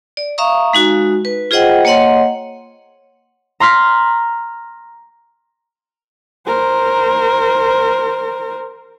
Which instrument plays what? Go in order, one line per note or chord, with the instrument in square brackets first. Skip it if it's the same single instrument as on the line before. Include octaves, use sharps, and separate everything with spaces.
[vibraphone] D5
E5 F5 A#5 C#6 D#6
G#3 D#4 F#4
B4
F4 G#4 C5 D#5 F#5 G5
A#3 C#5 D#5 F#5 C6
[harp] A#5 C6 F6 B6
[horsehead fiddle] A#4 C5